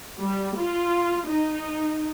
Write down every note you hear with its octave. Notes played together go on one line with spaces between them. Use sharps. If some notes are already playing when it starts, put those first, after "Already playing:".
G3
F4
D#4